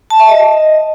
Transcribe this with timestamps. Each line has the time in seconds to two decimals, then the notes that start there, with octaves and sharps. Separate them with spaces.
0.10 A5
0.20 E5
0.29 D#5